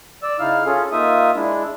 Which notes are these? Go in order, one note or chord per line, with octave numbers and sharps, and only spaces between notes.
D5 E6
C#3 D#4 E4 F5 F6
C#4 F4 G#4 A4
A#3 D#4 F4 E5 D#6
G#3 D4 E4